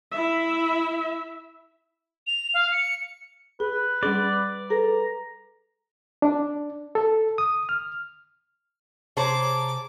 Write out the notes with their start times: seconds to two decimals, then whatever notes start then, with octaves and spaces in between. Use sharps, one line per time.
0.11 E4 E5
2.27 F7
2.54 F5
2.72 C#7
3.60 G#4 B4
4.03 G3 C#4 G#4 D5
4.70 G#4 A4 B4 A#5
6.22 D4
6.95 A4
7.38 D#6
7.69 F6
9.17 C3 G#4 C5 C#5 A5 A#5 D6